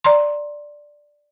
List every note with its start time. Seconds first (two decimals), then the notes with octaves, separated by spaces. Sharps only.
0.04 D5 A#5 C6